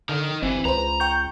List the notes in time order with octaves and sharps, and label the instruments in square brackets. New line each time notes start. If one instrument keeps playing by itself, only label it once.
[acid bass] D3 [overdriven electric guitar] D#4 A#4
[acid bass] G1 [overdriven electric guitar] E3 [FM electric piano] C4
[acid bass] C#2 [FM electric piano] B4 C5 [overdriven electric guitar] A#5
[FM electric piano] G5 C#6 G6